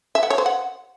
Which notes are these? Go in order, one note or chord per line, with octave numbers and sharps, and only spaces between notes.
E5
F#5
C#5
C5
F#5